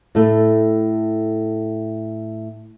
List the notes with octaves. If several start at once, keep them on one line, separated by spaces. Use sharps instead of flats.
A2 A3